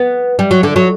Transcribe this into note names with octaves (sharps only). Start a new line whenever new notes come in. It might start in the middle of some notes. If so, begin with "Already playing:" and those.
Already playing: B3
G3
F#3
D3
F#3